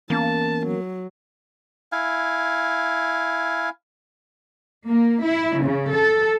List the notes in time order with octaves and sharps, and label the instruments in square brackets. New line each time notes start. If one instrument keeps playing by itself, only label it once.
[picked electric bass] E3 B3 C#4 [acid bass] A#3 [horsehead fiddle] A5
[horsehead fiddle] F#3
[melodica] E4 F5 G#5
[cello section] A#3
E4
C#3
A4